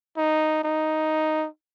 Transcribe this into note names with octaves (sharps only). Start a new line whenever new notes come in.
D#4
D#4